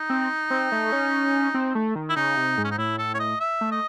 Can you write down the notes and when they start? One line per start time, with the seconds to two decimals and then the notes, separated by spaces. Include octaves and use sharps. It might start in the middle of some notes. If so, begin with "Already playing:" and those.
Already playing: D#4
0.10 C4
0.51 C4
0.72 A3
0.92 C#4
1.54 C4
1.75 A3
1.96 D#3
2.09 E4
2.16 C#3 D#4
2.37 C3
2.58 G#2
2.64 C#4
2.71 D#4
2.78 A2 E4
2.98 A4
3.14 C#5
3.20 D#5
3.40 E5
3.61 A3
3.71 D#5